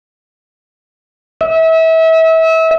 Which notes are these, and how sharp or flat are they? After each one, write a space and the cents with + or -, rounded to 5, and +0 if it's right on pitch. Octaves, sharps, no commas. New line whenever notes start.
E5 -30